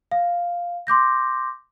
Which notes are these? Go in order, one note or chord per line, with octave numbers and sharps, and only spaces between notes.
F5
C6 D6 G6 A#6